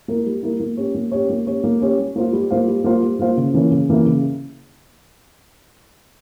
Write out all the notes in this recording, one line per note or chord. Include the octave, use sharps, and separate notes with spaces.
A#3 E4 A#4
G3
A#3 E4 A#4
A#3
C#4 G4 C#5
A#3
C#4 G4 C#5
A#3
C#4 G4 C#5
A#3
C#4 G4 C#5
G3
A#3 F4 C5 F5
G3
A#3 F4 C5 F5
G3
A#3 F4 C5 F5
G3
A#3 F4 C5 F5
C#3
E3 A#3 C#4 E4
C#3
E3 A#3 C#4 E4
C#3